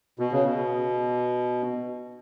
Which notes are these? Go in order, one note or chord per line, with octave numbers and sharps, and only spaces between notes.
B2
C#3
B2